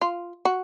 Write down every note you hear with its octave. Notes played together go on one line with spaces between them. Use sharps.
F4
F#4